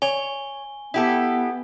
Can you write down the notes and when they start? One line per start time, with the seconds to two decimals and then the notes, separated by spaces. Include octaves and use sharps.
0.02 C#5 G#5 G7
0.94 B3 E4 G4 A4